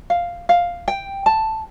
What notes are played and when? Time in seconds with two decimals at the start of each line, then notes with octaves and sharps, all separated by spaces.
0.10 F5
0.49 F5
0.88 G5
1.26 A5